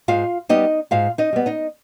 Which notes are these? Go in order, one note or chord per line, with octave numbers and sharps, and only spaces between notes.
G#2 F4 F5
G3 B3 D#4 D#5
G#2 F4 F5
D#4 D#5
G3 B3
D#4 D#5